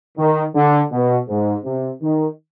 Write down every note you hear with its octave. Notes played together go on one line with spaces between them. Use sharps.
D#3
D3
B2
G#2
C3
D#3